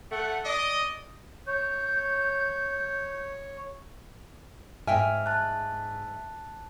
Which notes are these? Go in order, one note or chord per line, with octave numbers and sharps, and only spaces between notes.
A3 F#5
D5 D#5
C#5 G6
G#2 E5 G5 G#5 F6
A5 F#6